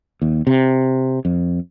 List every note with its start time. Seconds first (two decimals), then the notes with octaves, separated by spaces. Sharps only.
0.22 D#2
0.47 C3
1.25 F2